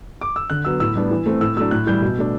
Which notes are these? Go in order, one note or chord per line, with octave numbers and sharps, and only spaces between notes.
D6
E6
D3 F#6
F#3 B3 E6
A2 E6
G3 B3 D4
E3
A3 C4
A2 E6
F#3 A3 D4 E6
A2 F#6
E3 G3 G6
B2
A3 D4